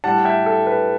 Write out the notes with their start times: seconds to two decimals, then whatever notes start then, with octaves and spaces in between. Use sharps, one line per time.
0.04 A2 G3 F#5 A5
0.25 E5 G5
0.46 A4
0.67 B4